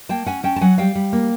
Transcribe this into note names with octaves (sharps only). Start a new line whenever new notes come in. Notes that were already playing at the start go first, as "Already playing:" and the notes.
A#3 G5 A5
C#4 F#5 G#5
C#4 G5 A5
A5
F#3 F#5 G#5
G3 F5 G5
G3
A#3